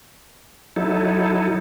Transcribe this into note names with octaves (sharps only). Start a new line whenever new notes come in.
F#3 D#4 E4 A4